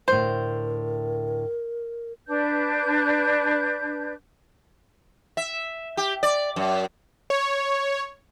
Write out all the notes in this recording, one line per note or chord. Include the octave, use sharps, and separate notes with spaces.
D2 A2 A#4 C5
D4 B4 G6
E5
G4
D5
F#2
C#5